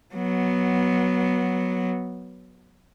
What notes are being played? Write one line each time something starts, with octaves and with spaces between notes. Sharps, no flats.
F#3 B3